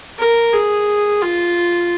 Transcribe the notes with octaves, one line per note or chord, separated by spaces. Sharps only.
A#4
G#4
F4